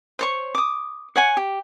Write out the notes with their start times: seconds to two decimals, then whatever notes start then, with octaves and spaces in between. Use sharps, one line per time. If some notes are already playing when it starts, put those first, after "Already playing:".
0.19 C5 C#5 C#6
0.55 D6 D#6
1.16 C#5 F#5 G#5
1.37 G4